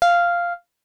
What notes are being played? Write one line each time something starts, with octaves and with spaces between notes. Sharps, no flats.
F5